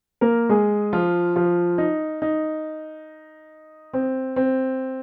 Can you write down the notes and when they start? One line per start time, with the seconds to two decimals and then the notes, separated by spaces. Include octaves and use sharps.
0.21 A#3 A#4
0.49 G#3 G#4
0.93 F3 F4
1.36 F3 F4
1.78 D#4
2.22 D#4
3.93 C4
4.36 C4